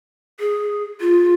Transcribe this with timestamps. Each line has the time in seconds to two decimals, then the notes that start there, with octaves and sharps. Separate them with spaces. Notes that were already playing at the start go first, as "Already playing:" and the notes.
0.40 G#4
1.01 F4